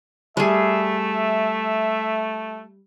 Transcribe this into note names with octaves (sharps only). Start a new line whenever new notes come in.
G3 A3 G#4 E5